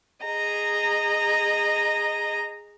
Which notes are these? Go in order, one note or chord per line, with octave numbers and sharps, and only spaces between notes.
G#4 D#5 A#5